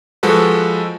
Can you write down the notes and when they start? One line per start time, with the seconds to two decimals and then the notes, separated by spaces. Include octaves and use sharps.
0.23 F3 G#3 F#4 A4 B4